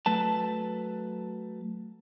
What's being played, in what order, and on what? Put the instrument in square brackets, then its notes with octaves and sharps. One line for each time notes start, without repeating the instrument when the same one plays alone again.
[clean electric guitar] F#3 A3 B4 A5